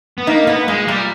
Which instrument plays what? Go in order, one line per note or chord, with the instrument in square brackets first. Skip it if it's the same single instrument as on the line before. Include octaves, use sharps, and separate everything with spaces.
[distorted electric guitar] B3
[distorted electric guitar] A#3 [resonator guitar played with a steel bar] D#4
[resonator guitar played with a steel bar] A#3 [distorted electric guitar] B3
[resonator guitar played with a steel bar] A#2 [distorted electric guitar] G#3
[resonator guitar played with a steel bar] A#2 [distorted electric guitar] G3